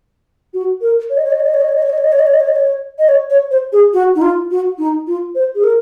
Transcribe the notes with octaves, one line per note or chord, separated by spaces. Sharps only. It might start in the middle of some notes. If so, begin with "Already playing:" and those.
F#4
A#4
C#5
D#5
C#5
D#5
C#5
D#5
C#5
D#5
C#5
D#5
C#5
D#5
C#5
D#5
C#5
D#5
C#5
D#5
C#5
D#5
C#5
D#5
C#5
C#5
C5
G#4
F#4
D#4
F4
F#4
D#4
F4
C5
G#4
A#4